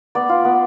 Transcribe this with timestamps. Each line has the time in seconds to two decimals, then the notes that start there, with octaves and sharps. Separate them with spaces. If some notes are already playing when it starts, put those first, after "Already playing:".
0.15 B3 D5
0.29 F4
0.45 B3